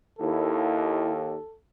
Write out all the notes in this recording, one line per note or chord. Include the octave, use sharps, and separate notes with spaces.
D#2 E4 A4